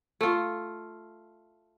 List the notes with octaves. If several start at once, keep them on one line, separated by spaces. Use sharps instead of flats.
A3 F4